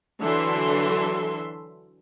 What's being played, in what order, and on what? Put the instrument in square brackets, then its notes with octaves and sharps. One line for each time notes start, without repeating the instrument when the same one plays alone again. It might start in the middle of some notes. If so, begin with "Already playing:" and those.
[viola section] D3 E3 F#3 A4 E5 C6